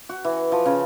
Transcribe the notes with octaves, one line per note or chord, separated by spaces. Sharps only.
F#4
E3
F3
C#3